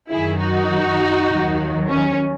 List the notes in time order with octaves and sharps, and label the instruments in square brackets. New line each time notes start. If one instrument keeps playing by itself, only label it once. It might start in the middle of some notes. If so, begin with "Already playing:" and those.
[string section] F#2 D#3 F#3 E4 G#4
D#4 F#4
D#2 D#3 F#3
C#4